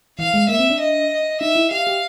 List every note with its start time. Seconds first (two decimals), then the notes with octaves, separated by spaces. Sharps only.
0.19 E3 F5
0.34 G#3
0.48 A#3 E5
0.59 C4
0.70 D4
0.80 D#5
1.40 D#4 E5
1.55 E4
1.71 G4 F5
1.87 G4